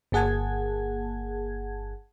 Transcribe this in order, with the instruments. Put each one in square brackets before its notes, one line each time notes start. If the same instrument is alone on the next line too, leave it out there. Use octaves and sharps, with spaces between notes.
[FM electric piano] G1 A#3 G#4 F#5 A5 G#6